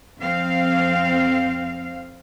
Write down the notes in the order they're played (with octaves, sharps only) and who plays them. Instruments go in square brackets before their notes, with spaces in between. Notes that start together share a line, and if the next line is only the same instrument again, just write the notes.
[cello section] F2 C4 F5